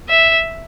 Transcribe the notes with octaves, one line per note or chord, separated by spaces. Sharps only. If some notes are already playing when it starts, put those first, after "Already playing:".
E5